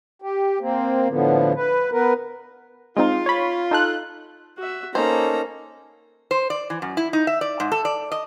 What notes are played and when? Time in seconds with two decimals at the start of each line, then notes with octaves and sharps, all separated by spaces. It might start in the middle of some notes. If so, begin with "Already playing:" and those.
0.22 G4
0.60 A#3 C4
1.08 A2 D3 F3 B3
1.55 B4
1.92 B3 A#4 B4
2.97 G#3 C4 D#4 F4
3.26 C#5 B5
3.71 D#4 A4 F#6
4.58 F#4 E5
4.95 A#3 C#4 D#4 A4 C5 A#5
6.31 C5
6.50 D5
6.70 E3
6.82 F#2
6.97 E4
7.13 D#4
7.27 E5
7.41 D5
7.60 G#2
7.72 A4
7.85 D5
8.12 D#5